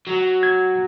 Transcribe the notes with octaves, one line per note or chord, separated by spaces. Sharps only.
F#3
G#6